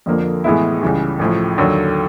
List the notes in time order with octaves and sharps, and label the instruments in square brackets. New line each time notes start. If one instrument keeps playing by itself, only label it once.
[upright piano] F2 D3 F3 A#3
A2 E3 G#3 B3 E4
C#2 C#3 E3 G3
A1 A2 F3
D#2 D3 F#3